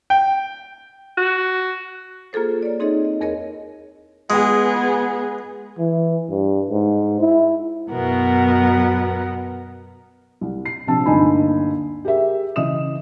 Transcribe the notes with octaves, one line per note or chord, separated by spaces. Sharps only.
G5
F#4
A#3 F4 G#4 A4 C5
C#5 D5
C4 D#4 G#4 A4 C#5 D#5
D#5
E2 G#4 A#4 C#5 D#5
G#3 B3 G#4
E3
G2
G#2
E4
F#2 B2 B3 A#4 F#5
C2
C7
A#1 C3 C4 A5 E6
G1 D2 A#3 D#4 G#5 B5
G4 G#4 A#4 E5
C#3 E3 D#5 E5 D#6 E7